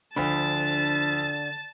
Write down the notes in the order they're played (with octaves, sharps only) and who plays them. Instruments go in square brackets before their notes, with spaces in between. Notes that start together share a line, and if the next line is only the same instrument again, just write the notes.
[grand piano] D2 F3 B5 [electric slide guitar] D3 [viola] A5